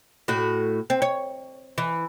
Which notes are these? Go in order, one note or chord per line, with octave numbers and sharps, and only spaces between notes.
A2 F#4
C4
C#5
E3